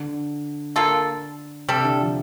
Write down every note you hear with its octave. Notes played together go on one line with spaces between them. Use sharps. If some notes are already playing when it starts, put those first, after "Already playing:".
Already playing: D3
A#3 F4 A4
C3 G3 D4 A4
D3
F3